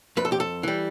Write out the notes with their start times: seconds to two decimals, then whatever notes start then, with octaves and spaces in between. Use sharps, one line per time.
0.17 F2 B4
0.25 A4
0.32 G4
0.40 A4
0.63 E3 G3